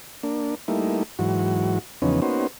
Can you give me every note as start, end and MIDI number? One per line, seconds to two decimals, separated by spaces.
0.23 0.55 58
0.23 0.55 62
0.68 1.03 55
0.68 1.03 57
0.68 1.03 58
0.68 1.03 63
0.68 1.03 64
1.19 1.79 44
1.19 1.79 52
1.19 1.79 54
1.19 1.79 66
2.02 2.20 40
2.02 2.20 49
2.02 2.20 53
2.02 2.20 59
2.02 2.20 61
2.02 2.20 63
2.22 2.47 58
2.22 2.47 59
2.22 2.47 61
2.22 2.47 63
2.22 2.47 66
2.22 2.47 72